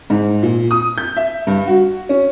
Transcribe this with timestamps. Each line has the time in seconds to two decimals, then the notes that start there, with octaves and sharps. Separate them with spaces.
0.10 G#2
0.43 A#2
0.71 D#6
0.98 G6
1.17 E5
1.47 G2
1.67 F#4
2.09 C#4